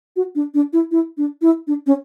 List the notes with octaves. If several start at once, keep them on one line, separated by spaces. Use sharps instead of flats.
F#4
D4
D4
E4
E4
D4
E4
D4
C#4